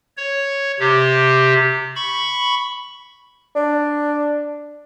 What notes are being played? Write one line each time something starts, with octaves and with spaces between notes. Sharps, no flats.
C#5
C3 G4
B5 C#6
D4